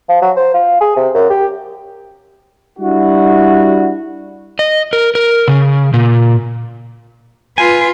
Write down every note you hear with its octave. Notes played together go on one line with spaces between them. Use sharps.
F3
F#3
C5
F4
G#4
C3
F#2
G4
G3 D4 E4 F#4
D#5
A#4
A#4
C#3
A#2
F4 B4 G#5